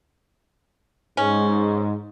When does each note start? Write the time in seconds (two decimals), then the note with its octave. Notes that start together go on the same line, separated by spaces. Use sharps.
1.17 G#2 C#4